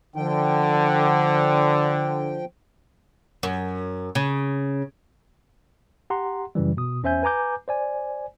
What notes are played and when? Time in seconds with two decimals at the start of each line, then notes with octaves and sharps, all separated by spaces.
0.16 D3 F3 G5
3.43 F#2
4.15 C#3
6.10 G4 F#5 A#5 C6
6.55 F#2 C#3 E3 G3
6.77 B2 D#6
7.03 E2 C#4 C5 E5 G#5 G6
7.23 B4 G#5 A#5 D6 G6
7.68 C5 D5 G#5